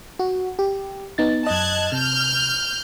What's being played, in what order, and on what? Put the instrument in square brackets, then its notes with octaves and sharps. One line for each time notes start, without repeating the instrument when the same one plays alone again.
[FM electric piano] F#4
G4
B3 D#4 A6
[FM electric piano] F#2 D#5 [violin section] A5 F#6 G#6
[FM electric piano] C3 [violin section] F6 G6